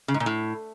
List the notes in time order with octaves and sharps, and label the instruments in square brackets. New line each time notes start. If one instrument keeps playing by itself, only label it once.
[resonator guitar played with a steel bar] C#3
G#2
A#2
A2